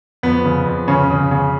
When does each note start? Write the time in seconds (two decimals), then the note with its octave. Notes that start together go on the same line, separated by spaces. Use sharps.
0.23 F2 B3
0.45 C#3
0.66 F2
0.88 C#3 C#4
1.10 C#3
1.31 C#3